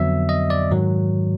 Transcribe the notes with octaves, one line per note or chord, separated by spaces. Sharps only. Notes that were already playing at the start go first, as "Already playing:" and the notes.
Already playing: F2 D3 F#3 B3 E5
D#5
D5
G#2 D#3 F#3